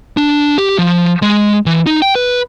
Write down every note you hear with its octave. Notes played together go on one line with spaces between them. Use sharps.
D4
G4
F3
G#3
E3
D#4
G5
B4